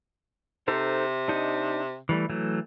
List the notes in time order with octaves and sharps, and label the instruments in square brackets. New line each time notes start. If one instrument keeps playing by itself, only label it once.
[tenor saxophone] C3 [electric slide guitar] D#4 A4 C5
[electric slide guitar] D4 D#4 D#5
E3 G3 A3
E3 F#3 A3